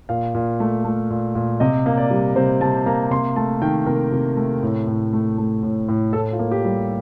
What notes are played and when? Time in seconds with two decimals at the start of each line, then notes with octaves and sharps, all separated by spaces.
0.09 A#2 F5
0.35 A#2
0.60 A3
0.85 A3
1.10 A#2
1.35 A#2
1.60 C3 D#5
1.86 A#3
1.97 D5
2.11 G3
2.36 C3 C5
2.61 C3 A5
2.86 A#3 A#5
3.11 C3 C6
3.36 A3 A5
3.62 D#3 G5
3.86 C3 A#4
4.12 C3
4.37 A3
4.63 A2
4.87 A2
5.13 A3
5.38 A3
5.63 A2
5.89 A2
6.13 A2 A4
6.32 F4
6.39 A#3
6.51 G4
6.64 G3